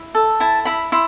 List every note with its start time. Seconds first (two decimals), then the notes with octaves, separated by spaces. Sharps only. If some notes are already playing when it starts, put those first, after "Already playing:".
Already playing: E4
0.15 A4
0.40 E4 A5
0.65 E4 B5
0.92 E4 C6